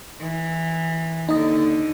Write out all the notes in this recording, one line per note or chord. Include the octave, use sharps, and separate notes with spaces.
E3
D#2 D3 D#4 D#5